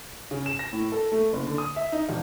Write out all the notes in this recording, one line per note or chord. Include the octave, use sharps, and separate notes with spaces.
C#3
E7
A#6
A2
A4
A3
F#1
D3
D#6
E5
D#4
E1